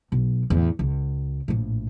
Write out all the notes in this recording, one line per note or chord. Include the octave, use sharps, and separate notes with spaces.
B1
E2 A2
C#2
A#1 A2